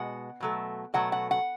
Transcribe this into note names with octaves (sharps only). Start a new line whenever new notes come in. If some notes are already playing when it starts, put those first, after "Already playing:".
Already playing: B2 G#3 F#5
B2 F#3 A3
B2 F#3 A3 F#5
F#5
F#5